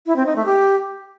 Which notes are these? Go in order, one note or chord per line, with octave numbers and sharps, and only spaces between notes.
E4
C4
D#4
A3
G4